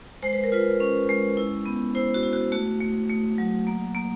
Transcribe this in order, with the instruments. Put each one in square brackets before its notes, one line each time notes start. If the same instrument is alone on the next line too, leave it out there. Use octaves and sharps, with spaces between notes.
[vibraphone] G#3 C5
B4
A#4
F4 B4
C#4
G#3
E4
B3
E4 C5
F#4
E4
F#4
A3 F#4
A3
A3
F#3
A#3
A#3